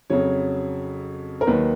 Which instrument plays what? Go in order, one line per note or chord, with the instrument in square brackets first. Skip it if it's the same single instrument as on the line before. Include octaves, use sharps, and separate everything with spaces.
[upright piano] F2 C#3 F#3 C#5
A#4
D#2 D#3 F#3 B4